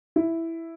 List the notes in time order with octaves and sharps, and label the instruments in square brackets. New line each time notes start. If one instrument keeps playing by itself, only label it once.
[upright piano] E4